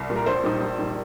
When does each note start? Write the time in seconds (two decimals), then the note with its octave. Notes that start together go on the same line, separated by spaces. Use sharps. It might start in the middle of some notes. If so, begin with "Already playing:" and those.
Already playing: C2
0.10 A#2 G3
0.16 A#4
0.26 A#1 C5
0.44 A#2 G3 D#4 G4
0.61 A#1
0.78 A#2 G3 D#4